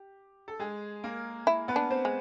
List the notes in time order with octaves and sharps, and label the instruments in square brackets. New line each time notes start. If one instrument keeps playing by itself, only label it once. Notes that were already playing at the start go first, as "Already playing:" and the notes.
Already playing: [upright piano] G4
A4
G#3 G#4
A#3 A#4
[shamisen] E4
[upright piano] B3 B4
[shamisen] D4
[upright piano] C4 C5
[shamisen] G#3